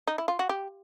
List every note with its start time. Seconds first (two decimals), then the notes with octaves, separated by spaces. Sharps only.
0.07 D#4
0.18 E4
0.28 F4
0.39 F#4
0.49 G4